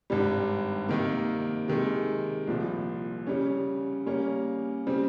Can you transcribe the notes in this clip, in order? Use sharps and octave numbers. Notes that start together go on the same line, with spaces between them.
G#1 G2 G3
C3 D#3 A#3
C3 D#3 G#3
C2 A#2 F3
C#3 G3 C#4
C#3 G3 A#3 C#4
C#3 G3 C4